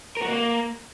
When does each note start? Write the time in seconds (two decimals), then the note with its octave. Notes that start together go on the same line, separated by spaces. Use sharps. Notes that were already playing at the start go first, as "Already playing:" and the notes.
0.17 A#4
0.22 F#4
0.28 A#3